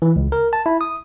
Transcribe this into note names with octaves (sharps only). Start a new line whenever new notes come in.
E3
C#2
A#4
A5
E4
D#6